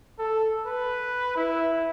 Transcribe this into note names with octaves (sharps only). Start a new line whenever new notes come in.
A4
B4
E4